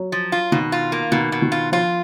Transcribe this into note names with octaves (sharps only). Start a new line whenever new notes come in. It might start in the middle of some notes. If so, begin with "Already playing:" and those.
Already playing: F#3
F3
F4
B2 D#3
F4
A#3
B2 D#3
B2
D#3
F4
F3 F4